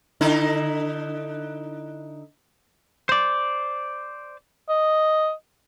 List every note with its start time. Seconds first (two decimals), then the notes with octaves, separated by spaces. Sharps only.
0.21 D3 D#4 E4
3.09 C5 D5
4.69 D#5